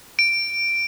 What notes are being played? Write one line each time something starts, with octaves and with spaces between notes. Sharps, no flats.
D7